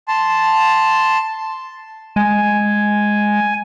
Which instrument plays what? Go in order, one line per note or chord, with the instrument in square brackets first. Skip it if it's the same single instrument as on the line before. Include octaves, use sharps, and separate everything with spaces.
[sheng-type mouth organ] A5 C6
[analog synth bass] G#3 [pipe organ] G#5